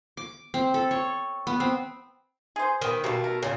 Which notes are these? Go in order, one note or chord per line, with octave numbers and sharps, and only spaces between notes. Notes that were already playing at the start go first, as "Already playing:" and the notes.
D6
C4
A4
C#5
B3
C4
G#4 C5
D#3 B3
B2 G3 A3 A#3
A#4
A#2 C#3 A#3